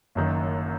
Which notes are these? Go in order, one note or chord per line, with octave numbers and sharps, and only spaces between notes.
F#1 F#2 D#3